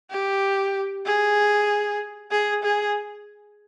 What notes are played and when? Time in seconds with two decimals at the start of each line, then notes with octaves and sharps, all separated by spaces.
0.11 G4
1.06 G#4
2.31 G#4
2.63 G#4